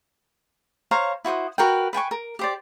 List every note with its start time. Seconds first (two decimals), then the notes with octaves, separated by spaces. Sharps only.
0.91 C5 C#5 F5 A#5
1.25 E4 F#4 C5 D#6
1.58 F#4 A#4 B4 G5
1.93 B4 G5 G#5 C#6
2.11 A#4
2.39 G4 C5 D5